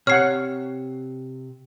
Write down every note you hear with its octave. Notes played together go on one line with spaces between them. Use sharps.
C3 C#5 F#5 F6 C7